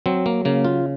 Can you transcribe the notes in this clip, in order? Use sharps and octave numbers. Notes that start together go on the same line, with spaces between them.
F#3 C4
A#3
C#3 A#3
F4